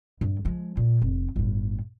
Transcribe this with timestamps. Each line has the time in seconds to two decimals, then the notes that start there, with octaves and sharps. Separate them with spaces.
0.21 G2
0.45 F3 G#3
0.77 A#2
1.01 F1
1.36 G1 A2